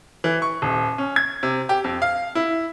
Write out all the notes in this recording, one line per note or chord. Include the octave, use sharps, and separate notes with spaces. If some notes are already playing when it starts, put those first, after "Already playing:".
E3
C#6
D#1
C#4
G#6
C3
G4
F2
F5
E4